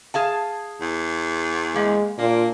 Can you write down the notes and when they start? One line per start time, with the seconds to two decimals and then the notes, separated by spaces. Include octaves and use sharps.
0.14 G#4 F5 A5
0.81 E2
1.76 G#3 A#3
2.19 A#2 A#3 D4